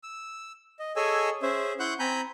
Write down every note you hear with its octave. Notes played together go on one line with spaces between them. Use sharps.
E6
D#5
G#4 A4 C#5 D#5 G#5 E6
C#4 G#4 C5 E5
E4 F#5 C6 C#6 F#6 G6
C4 G#5 A#5 B5 G6